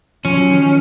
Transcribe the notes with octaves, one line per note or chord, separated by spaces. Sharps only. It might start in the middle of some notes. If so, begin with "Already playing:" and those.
F3 C#4
F#3
D#3 F3